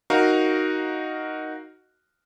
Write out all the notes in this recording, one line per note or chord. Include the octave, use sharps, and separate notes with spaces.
D#4 F#4 A#4 F5